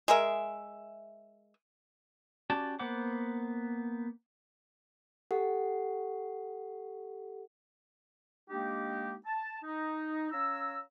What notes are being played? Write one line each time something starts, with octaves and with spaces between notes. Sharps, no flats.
G#3 G#4 A#4 E5
C#4 F#4 G4 D5 A5
A#3 B3 C5 F#5 D6
G4 A4 F#5
G#3 A#3 D4 D#4 G4
A5
D#4
C#4 C#5 F5 A#5 E6